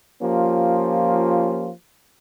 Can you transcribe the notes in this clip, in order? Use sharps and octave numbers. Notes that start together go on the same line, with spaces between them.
F3 A#3 C#4 F4 G4